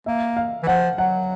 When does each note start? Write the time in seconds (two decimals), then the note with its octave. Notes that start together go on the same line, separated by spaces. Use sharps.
0.06 A#3 E5
0.37 F5
0.63 E3
0.67 F3 F#5
0.98 F#3 F#5